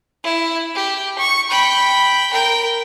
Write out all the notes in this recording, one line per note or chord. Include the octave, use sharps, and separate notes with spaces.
E4
G4
C#6
G5 B5
A#4 G5